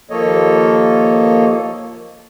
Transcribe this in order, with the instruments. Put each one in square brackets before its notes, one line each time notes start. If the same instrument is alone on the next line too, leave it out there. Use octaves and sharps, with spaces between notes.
[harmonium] D#2 F3 A#3 A4 C#5 D#5